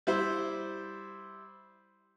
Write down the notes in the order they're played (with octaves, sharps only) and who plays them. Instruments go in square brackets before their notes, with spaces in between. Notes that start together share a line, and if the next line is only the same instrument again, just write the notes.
[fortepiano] G3 E4 C5